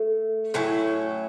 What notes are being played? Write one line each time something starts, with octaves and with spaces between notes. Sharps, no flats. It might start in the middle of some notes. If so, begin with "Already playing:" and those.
Already playing: A3 A4
A2 F#3 C#4 E4